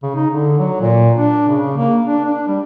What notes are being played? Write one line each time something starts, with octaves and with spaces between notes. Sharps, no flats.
C#3
D#4
D3
F#3
A#2
D4
C#3
A#3
D4
D4
G3